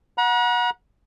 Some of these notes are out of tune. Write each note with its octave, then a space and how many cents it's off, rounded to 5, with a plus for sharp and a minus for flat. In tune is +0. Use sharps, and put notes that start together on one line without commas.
F#5 -20 A#5 +45